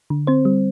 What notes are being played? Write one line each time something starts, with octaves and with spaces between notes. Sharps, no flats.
D3
C4 C5
G3